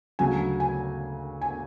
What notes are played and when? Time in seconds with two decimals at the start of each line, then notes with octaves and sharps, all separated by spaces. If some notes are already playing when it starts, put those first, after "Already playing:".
0.19 D2 C#3 F#3 G#5
0.60 G#5
1.42 G#5